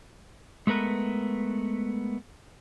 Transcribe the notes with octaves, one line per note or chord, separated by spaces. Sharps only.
G#3 A3 B3 A#4 B4